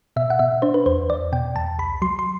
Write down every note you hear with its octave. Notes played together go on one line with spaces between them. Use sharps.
B2 E5
F#5
B2 E5
D4 C5
B4
E2 C5
E2 D5
B2 G5
E2 A5
C2 B5
F#3 C6
C6